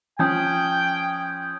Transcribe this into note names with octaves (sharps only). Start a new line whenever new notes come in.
F3 C#4 G5 D#6 G6 G#6